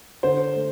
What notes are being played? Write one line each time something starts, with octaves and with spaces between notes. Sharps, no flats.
D3 C5
A3